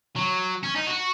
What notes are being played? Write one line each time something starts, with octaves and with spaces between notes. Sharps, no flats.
F#3
C#4
D#4
F#4